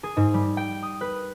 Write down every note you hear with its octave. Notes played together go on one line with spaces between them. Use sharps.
G#4
G#2
G3
G5
D#6
B4